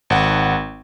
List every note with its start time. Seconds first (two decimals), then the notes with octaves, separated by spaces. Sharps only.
0.10 G#1 F#5